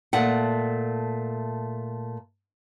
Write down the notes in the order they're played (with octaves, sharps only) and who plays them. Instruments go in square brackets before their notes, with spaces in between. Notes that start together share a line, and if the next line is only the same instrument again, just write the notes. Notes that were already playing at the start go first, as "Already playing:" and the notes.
[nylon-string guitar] A#2 A3 F#5